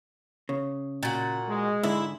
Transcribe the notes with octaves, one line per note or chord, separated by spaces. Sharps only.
C#3
A#2 F#4
G#3
G#2 D3 E4